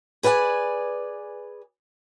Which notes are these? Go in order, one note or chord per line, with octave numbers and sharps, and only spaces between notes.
G#4 B4 D5 F5 G#5